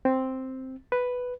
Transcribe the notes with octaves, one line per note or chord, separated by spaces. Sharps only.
C4
B4